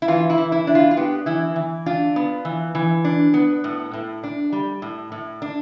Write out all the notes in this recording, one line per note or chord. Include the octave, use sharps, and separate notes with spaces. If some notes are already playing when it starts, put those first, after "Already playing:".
E4
E3 F4
E4
E3
E4
D4
F4
F4
B3 G4
E3 E4
E3
D4 F4
B3
E3
E3
D4
B3
A2
A2
D4
G3
A2
A2
D4